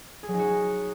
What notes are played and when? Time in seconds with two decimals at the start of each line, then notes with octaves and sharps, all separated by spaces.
0.23 G#4
0.28 F#3
0.34 D#4
0.39 F#4